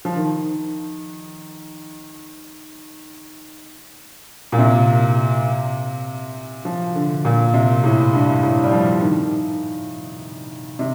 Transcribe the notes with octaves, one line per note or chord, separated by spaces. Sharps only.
F3
D#3
A#2
C3
F3
D3
A#2
C3
A2
G2
A2
G3
F3
D#3
C3